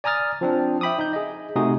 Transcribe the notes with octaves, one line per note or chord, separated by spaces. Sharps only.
D5 G#5 A#5 D#6 F6 A6
F3 C4 D4
E5 G5 B5 D6 D#6
D#4 G6
G#4 D#5
C3 A3 D#4 F#4 G#4 D#6